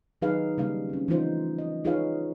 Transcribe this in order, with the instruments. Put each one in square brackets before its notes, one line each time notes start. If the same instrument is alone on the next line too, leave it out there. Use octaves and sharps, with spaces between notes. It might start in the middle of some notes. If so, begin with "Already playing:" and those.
[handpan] D#3 F#3 D#4 G#4 B4 F5
C#3 G3 A#3 D4 F5
C4 C#4
E3 F3 A3 D#4 F4 C5
D#5
D#4 F4 G#4 B4 C#5 F5